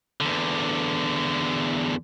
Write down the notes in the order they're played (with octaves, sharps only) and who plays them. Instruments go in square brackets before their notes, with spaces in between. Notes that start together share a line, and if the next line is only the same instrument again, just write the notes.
[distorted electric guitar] E2 D3